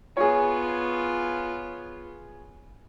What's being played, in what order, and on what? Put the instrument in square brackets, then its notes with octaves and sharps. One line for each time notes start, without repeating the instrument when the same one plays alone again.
[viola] B3 F4 [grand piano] G#4 C#5